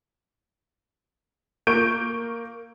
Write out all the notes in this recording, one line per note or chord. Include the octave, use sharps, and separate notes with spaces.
A#3 C#6 G6 D7